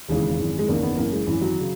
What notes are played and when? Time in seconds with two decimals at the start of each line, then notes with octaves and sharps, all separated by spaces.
0.09 E1 D#2 C#3 E3 G#3
0.39 G#1 F#2 E3
0.59 G#3
0.68 F#1 E2 D#3 A#3
0.83 B3
0.97 F#1 F#2 E3 A#3
1.12 G#3
1.27 G#1 F#2 E3
1.41 F#3
1.60 C#3